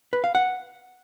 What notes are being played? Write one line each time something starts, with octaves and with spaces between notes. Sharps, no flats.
B4
F5
F#5